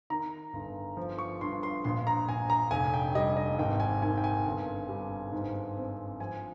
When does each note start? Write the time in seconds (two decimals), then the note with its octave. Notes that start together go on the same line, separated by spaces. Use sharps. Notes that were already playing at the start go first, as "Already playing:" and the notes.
0.10 D#3 A#5
0.53 G1
0.97 F3
1.18 C#6
1.41 G2 C6
1.63 C6
1.84 A#1 C6
2.07 A#5
2.28 A#1 G#5
2.50 A#5
2.71 F1 G#5
2.94 G5
3.15 G3 D#5
3.37 D#5
3.58 G#1 G5
3.80 G#5
4.02 D#3 G#5
4.18 G5
4.24 G#5
4.45 G1
4.89 G3
5.32 G#2
5.76 C4
6.20 F3 G#5